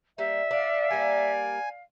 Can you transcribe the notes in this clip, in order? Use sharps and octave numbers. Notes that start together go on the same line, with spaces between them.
G3 A#3 E5
D4 D5 F5
G3 A#3 G#5